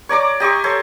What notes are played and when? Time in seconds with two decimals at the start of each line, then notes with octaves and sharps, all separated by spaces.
0.09 C#5 D5 A#5 D6
0.40 G4 D#5 C6 C#6
0.64 A4 C5 C#5 A5